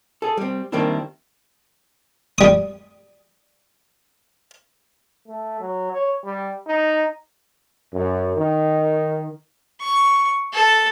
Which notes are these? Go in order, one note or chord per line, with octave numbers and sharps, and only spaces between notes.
G#4 A4
G3 C4
D#3 G3 A#3 C4 D4 E4
G3 D#6
A3
F#3
C#5
G3
D#4
F#2
D#3
C#6
A4